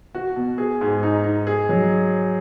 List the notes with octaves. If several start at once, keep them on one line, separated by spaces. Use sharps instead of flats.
F#4
B2
G#4
G#2
D#4
D#4
G#4
F#3